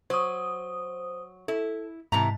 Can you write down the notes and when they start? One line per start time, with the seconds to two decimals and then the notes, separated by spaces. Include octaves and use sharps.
0.10 F#3 C5 D#6
1.48 E4 A4
2.12 G#2 C3 E3 A5 A#5